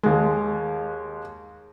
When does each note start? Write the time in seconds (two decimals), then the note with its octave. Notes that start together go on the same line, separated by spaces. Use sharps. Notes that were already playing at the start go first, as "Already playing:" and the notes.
0.03 D#2 G#3